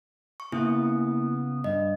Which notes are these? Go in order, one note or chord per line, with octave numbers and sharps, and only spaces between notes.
C#6
C#3 A#3 B3 E4
G2 D#5